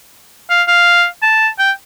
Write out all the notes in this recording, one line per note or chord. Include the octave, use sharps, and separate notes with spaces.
F5
F5
A5
G5